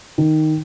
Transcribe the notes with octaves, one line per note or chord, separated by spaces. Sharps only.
D#3